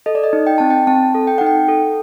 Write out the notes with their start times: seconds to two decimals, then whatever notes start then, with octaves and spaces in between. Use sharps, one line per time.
0.06 A4 D#5
0.15 D5
0.24 D#5
0.33 D#4
0.47 G5
0.58 C4 A5
0.70 G5
0.87 C4 A5
1.15 A4
1.27 G5
1.38 D#4 F#5
1.47 G5
1.68 A4